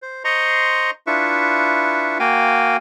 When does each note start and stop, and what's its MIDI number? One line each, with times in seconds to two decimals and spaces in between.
0.02 0.23 72
0.24 0.91 72
0.24 0.91 75
0.24 0.91 82
0.24 0.91 84
0.24 0.91 85
1.07 2.18 62
1.07 2.18 64
1.07 2.18 65
1.07 2.18 71
1.07 2.18 76
1.07 2.18 85
2.19 2.77 58
2.19 2.77 66
2.19 2.77 77
2.19 2.77 79
2.19 2.77 80